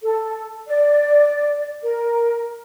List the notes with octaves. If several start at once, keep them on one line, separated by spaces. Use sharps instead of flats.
A4
D5
A#4